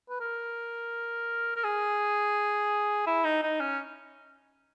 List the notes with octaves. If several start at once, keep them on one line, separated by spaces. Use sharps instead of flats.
B4
A#4
A#4
G#4
E4
D#4
D#4
C#4